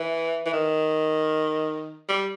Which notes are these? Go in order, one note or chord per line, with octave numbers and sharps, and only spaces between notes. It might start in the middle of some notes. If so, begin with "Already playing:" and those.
Already playing: E3
E3
D#3
G3